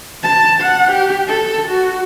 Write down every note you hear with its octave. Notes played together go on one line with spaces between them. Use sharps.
A5
F#5
G4
A4
F#4